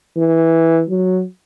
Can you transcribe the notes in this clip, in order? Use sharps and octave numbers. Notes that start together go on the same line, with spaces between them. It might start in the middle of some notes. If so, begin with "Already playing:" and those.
E3
F#3